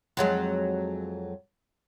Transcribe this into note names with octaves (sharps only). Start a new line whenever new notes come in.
F2 F#3 G#3